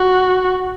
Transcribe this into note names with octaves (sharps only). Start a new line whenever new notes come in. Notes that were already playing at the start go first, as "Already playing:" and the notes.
Already playing: F#4